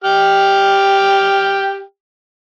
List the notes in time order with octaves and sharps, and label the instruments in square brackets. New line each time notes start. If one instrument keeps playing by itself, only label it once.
[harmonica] G4 G5 F6